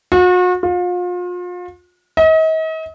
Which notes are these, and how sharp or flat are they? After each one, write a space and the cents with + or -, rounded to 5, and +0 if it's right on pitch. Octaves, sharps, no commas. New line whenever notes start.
F#4 -40
F4 +35
D#5 +40